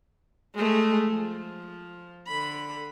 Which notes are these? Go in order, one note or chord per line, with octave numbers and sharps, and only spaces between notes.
G#3 A3
F3
D3 B5